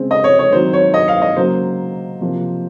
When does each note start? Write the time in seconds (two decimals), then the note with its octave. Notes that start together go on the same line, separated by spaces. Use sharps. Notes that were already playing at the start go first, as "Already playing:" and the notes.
Already playing: C#3 G#3 C4
0.11 D#5
0.24 C#5
0.39 C#5
0.52 D#3 F#3 C4 C5
0.73 C#5
0.94 D#5
1.08 F5
1.22 D#5
1.37 C#3 F#3 A#3 C5
2.21 C3 F3 A#3